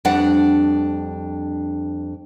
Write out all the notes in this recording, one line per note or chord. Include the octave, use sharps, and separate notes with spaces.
F2 G3 D4 F#5